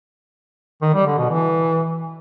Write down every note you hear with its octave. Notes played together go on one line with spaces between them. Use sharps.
D#3
G3
D3
B2
E3